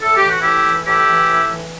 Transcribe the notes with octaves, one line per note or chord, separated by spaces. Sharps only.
A2 A4
G4
E3 F#4
A2 E4 G4
E3
A2 E4 G4
E3
A2
E3